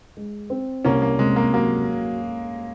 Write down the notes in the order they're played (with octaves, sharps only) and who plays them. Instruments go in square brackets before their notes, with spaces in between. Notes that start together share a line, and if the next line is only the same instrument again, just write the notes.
[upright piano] G#3
C4
[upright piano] C2 [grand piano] A#3 C#4
[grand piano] A#3
[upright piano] C3 [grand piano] G#3
[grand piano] A#3
[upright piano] F#3 [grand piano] A#3